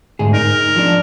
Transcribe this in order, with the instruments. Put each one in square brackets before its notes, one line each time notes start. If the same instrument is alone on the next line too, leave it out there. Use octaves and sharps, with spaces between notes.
[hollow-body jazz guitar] D2 G#2 G#4
[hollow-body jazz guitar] D#4 [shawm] A#4
[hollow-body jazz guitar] F3 D4